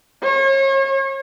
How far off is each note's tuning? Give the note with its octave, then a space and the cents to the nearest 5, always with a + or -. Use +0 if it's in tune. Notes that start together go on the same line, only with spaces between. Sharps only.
C#5 -40